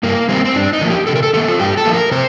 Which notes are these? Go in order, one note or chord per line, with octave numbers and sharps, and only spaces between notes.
G2 A#3
D#3 G3 A#3 C4
C4
G2 D4
D#4
D3 F3 A#3
G4
C3 A4
A#4
A4
D#3 A#3 A4
F4
G2 G4
A4
F3 A#3
A#4
C3 C5